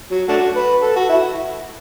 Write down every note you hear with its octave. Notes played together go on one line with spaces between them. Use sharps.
F#3
A3 D4 F#4
B4
A4
F#4
E4